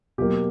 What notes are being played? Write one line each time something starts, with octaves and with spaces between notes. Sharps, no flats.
B2 F#3 A#3 G4